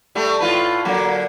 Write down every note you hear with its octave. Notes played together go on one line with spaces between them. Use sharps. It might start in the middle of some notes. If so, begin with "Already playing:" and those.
G3 A3
A2 F4 B4
D3 F#3 A#3